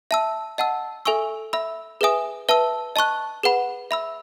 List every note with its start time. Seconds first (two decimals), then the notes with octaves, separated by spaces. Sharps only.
0.11 E5 A5 E6
0.58 D#5 F#5 A5 E6
1.05 A4 E5 G#5 C#6 E6
1.53 E5 B5 E6
2.01 G#4 B4 E5 G#5 D#6
2.49 B4 E5 A5 E6
2.96 D#5 A5 C#6 F#6
3.43 G#4 B4 F#5 B5
3.91 E5 B5 E6